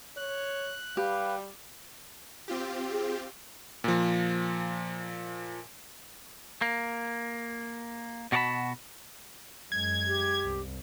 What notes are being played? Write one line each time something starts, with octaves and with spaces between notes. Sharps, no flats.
C#5 F#6
G3 G4 B4 F5
C4 F4 G4
G#4
A#2 F3
A#3
B2 F#4 A#4 D5 A5 B5
F#2 G#3 G#6
G4
C2